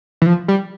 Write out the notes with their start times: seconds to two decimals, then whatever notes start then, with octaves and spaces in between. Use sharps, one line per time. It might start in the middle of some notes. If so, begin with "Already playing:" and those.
0.22 E3
0.26 F3
0.48 G3